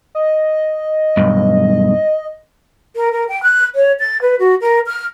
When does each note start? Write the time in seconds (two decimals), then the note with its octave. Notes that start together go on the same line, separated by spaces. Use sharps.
0.15 D#5
1.17 B1 G2
2.96 A#4
3.12 A#4
3.29 G5
3.43 F#6
3.75 C#5
4.00 A6
4.22 B4
4.39 F#4
4.61 A#4
4.87 F6